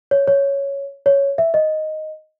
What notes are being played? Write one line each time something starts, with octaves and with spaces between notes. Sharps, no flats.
C#5
C#5
C#5
E5
D#5